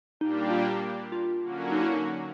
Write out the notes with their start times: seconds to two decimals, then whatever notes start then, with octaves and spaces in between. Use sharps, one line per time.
0.20 A#2 G3 A#3 D4 D#4 G4
0.50 F4
1.12 F4
1.42 D3 F#3 A#3 C#4 F#4
1.72 D#4
1.82 E4
1.94 D#4